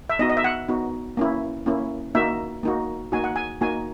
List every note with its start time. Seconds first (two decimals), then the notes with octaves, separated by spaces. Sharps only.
0.10 E5
0.19 B3 D#4 F#4 D#5
0.30 D#5
0.37 E5
0.44 F#5
0.68 B3 D#4 F#4
1.17 A#3 C#4 E4
1.66 A#3 C#4 E4
2.15 A#3 D#4 F#4 E5
2.63 A#3 D#4 F#4
3.12 A#3 D#4 F#4 G#5
3.24 F#5
3.36 G#5
3.61 A#3 D#4 F#4 G#5